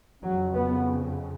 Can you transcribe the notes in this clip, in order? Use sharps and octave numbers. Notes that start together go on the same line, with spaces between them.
F2 C#3 F#3
B3